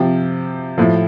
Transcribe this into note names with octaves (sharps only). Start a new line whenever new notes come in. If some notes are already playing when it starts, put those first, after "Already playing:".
Already playing: C3 F3 G4
A2 F3